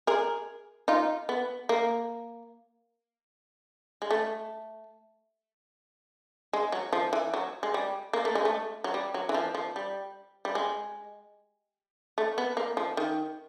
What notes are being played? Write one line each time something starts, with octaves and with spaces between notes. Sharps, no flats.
G#4 A#4
D#4 F4
B3
A#3
G#3
A3
G#3
F#3
F3
E3
F#3
G#3
G3
A#3
A3
G#3
A3
F#3
G3
F#3
E3
F3
F3
G3
G3
G#3
A3
B3
A#3
F3
D#3